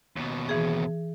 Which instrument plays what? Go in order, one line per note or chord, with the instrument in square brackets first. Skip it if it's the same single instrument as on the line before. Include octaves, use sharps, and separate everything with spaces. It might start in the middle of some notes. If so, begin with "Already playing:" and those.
[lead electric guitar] D#2 B2
[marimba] E3 G#4